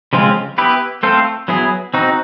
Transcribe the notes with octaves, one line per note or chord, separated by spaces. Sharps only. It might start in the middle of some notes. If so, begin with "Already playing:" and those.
C#3 F3 G#3 C4 F4
B3 E4 G4 B4
A3 C4 F4 A4 C5
F#3 B3 E4 G#4
C4 D#4 F#4